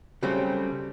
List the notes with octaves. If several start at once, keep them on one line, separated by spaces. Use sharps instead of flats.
C#3 F#3 G3 A3 C4 G4